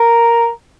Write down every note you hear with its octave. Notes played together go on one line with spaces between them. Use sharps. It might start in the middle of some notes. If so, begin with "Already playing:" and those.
Already playing: A#4